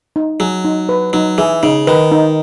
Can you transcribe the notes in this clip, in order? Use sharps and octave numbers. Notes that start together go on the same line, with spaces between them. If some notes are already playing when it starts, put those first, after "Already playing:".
D#4
F#3 G#4
D#4
B4
F#3 D#4
E3 G#4
C#3 D#4
D#3 B4
D#4